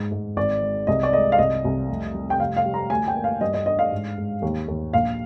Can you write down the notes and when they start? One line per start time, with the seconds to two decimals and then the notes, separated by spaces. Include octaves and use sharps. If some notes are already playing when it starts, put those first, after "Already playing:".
Already playing: G#2
0.11 G#2
0.36 G#1 D5
0.62 G#3
0.87 C2 D#5
1.03 D5
1.13 G#3 D#5
1.32 F5
1.38 C2 D#5
1.64 C2
1.89 F1
2.14 G3
2.30 G5
2.39 F1 F5
2.57 F5
2.65 G3
2.74 A#5
2.90 D2 G#5
3.08 G5
3.16 A#3
3.24 F5
3.41 G2 D#5
3.54 D#5
3.66 D4 D#5
3.79 F5
3.92 G#2
4.17 G#2
4.42 D#2
4.68 D#2
4.93 A#1 F5